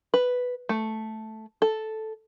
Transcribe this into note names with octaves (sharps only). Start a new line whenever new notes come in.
B4
A3
A4